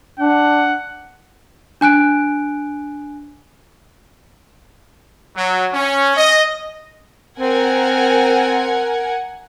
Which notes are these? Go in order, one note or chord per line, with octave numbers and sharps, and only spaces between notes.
D4 F#5
D4 G#5 F#6 D7
F#3
C#4
D#5
C4 A#4 F#5 G#5